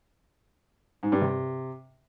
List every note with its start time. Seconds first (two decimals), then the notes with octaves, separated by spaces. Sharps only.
1.03 G#2
1.12 G2
1.21 C3